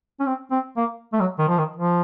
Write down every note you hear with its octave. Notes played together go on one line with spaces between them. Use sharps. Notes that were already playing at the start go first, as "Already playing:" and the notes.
C#4
C4
C4
A#3
A3
F#3
D#3
F3
D#3
F3